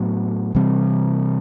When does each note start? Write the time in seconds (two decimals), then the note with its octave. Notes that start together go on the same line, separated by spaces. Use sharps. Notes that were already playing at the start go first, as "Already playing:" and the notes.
Already playing: A2 F#3 B3
0.55 C3 E3 G3 C4